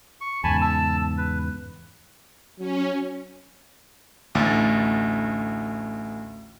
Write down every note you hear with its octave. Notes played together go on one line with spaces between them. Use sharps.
C#6
E2 G#2 C#3 G#5 A5 B5
A5 E6
B4
F#3 C#4
A1 D2 A6